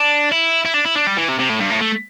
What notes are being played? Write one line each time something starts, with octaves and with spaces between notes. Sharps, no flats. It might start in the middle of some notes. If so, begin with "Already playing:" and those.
Already playing: D4
E4
E4
D4
E4
D4
G3
E3
C3
C3
A2
G2
A2
A3